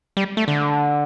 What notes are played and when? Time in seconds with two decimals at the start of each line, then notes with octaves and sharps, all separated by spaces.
0.17 G3
0.37 A3
0.48 D3